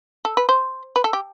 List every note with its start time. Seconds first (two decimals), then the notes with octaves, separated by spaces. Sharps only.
0.25 A4
0.37 B4
0.49 C5
0.96 B4
1.04 A4
1.13 G4